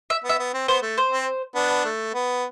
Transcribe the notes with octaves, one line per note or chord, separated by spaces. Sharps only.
E5
B3
E5
B3
C4
B3 C5
A3
C5
C4
B3 D4
A3
B3